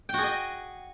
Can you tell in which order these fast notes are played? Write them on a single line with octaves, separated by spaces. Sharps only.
G5 F#4 G#4 D#5